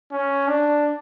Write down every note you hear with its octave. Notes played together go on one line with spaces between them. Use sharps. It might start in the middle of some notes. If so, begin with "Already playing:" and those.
C#4
D4